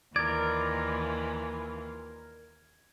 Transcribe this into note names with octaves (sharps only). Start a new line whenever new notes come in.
D#2 E3 F4 A#4 D5 G#6